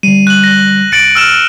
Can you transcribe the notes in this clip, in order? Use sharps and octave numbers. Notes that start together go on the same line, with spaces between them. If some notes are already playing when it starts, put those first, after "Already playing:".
D3 G3 D#7
F#6 F#7
A#6
C2 A6 C#7 D7 F#7
E6 F6 E7